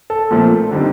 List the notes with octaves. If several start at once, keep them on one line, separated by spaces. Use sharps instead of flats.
A4
A#2 F3 A3 C4
D3 G3 C4 D#4